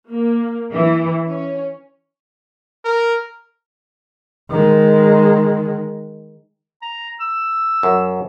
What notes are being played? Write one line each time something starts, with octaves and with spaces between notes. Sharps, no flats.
A#3
E3
C#4
A#4
D#3 G#3
A#5
E6
F#2